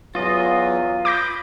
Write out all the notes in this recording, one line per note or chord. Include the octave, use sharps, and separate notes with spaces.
E2 E3 F#3 F4 D#5
B5 D6 G6 A#6